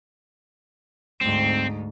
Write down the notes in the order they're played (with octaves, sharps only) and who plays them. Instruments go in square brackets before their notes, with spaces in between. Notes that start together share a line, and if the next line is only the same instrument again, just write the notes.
[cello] D2 G#2 [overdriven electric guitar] C4